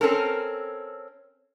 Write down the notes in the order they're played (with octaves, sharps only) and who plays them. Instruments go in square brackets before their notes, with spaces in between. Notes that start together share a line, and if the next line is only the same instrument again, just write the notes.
[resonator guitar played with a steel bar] C4 C#4 A4 A#4